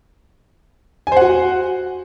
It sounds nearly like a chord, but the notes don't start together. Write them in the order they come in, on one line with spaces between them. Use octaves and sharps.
G#5 C5 F#5 F#4